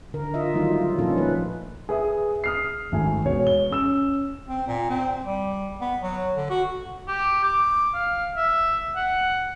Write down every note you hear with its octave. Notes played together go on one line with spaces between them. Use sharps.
D3 A#4
F4 D#5 E5
D#3 F#3 G3 A3 D#4 F4
F4
A#2 F3 C#4 F4 A4
F3 A3 B4
G#4 B4 E5 D#6
D#6 F6 C7
G#1 A3 G#5
E1 B3 C#5
G7
C#4 E6 E7
C4
A#2
C4
G3
B3
F#3
D3
F#4
G4
D6
F5
E5
F#5